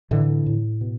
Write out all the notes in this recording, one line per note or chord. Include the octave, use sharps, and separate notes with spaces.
A2 D3 E3
A2
B2